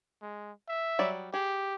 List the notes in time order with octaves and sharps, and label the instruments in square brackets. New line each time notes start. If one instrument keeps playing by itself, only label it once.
[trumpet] G#3
E5
[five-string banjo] F#3 G3 D5
[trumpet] G4 [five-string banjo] G#4